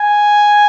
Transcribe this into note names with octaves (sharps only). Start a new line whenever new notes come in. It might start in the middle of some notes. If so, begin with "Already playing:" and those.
Already playing: G#5